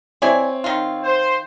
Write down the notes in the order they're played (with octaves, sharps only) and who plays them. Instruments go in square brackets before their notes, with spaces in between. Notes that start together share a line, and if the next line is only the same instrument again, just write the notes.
[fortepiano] C4 C#5 [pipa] E4 D5 G#5
[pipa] D#3 F4
[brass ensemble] C5